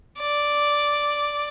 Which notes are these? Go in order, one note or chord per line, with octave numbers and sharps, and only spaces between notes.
D5